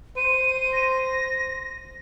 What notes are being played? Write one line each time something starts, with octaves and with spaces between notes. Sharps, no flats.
C5 D#7
A#6